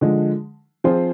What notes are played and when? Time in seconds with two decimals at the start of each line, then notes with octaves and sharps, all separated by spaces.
0.01 D3 F3 G#3
0.84 F3 C4 F4 G#4 C5